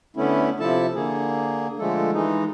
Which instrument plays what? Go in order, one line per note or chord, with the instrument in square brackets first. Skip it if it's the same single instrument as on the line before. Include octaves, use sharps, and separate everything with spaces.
[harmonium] D3 A3 B3 C#4 E4
C3 F3 E4 A4 A5
D3 A#3 G#4
D3 F3 G#3 A3 A4
E3 G#3 D#4